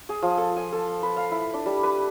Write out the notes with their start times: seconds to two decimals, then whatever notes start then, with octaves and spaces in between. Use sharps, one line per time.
0.09 G#4
0.23 F3
0.38 A4
0.56 G#5
0.73 A4
1.03 B4
1.17 F5
1.31 E4
1.54 D4
1.66 G3
1.83 B4